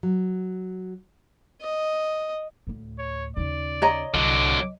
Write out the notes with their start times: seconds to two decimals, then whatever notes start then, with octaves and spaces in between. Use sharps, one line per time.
0.03 F#3
1.61 D#5
2.67 D2 A2
2.99 C#5
3.37 D#2 C#3 D5
3.82 C#5 D#5 A#5
4.14 C2 D3 F#3 D6